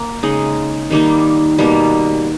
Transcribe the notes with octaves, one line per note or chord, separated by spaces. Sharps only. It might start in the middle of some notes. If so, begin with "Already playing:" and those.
Already playing: A#3
C#3 G#3 D#4
D#3 G3 A#3 D#4
B2 G3 A#3